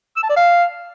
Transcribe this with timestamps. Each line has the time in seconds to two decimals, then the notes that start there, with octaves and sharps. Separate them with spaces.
0.16 E6
0.23 A5
0.30 D5
0.36 F5